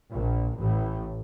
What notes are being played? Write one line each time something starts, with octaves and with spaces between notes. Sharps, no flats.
A#1 A#2
A1 A2